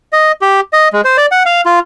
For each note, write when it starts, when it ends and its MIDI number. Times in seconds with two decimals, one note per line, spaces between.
0.13 0.32 75
0.42 0.60 67
0.73 0.88 75
0.93 1.01 56
1.05 1.17 72
1.17 1.26 74
1.32 1.43 78
1.46 1.61 77
1.66 1.79 65